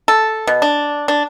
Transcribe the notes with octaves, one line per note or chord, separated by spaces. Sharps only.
A4
B2
D4
D4